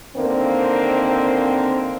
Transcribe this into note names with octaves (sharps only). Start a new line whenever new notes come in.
D3 D#3 A#3 C4